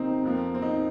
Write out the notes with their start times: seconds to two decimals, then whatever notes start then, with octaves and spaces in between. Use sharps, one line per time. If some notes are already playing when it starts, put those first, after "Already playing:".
Already playing: C3 A#3 C4 D#4
0.24 F2 F3 A#3
0.55 C4
0.62 D#4